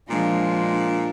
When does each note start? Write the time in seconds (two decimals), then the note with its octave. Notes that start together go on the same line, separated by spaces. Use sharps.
0.10 A#2 F3 G#3 D4